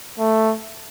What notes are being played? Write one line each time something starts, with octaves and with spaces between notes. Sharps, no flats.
A3